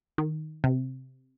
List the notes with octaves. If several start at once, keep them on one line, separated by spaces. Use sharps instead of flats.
D#3
C3